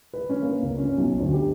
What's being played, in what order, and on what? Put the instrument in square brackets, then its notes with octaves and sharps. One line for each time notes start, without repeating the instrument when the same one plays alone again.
[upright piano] B4
C#4
A#3
C#2
C#4
B1
D2
G4